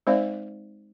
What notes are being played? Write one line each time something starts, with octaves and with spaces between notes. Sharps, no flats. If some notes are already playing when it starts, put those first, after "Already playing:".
G#3 C4 D#4 C5 D5 F5